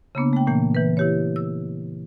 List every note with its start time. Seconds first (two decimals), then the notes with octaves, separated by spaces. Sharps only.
0.15 C#3 A#3 B3 D4
0.33 A3 G5
0.47 A#2 E3 A#3
0.75 E3 B4
0.97 E4 G4 C#5
1.36 E6